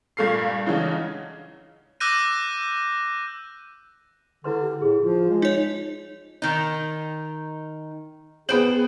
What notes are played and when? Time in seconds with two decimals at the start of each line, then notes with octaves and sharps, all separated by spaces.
0.17 G2 A#2 A3 F5 C7
0.66 C#3 E3 F#3 G#3 D4 D#4
2.00 D6 E6 F#6 G6 A#6 D#7
4.44 D3 E4 B4 C6
4.62 G4
4.82 A2 E4 G#4
5.01 F3 F4
5.30 G#3
5.42 D#4 C#5
6.42 D#3 D#4
8.49 B3 G#4 C5 G5 F#7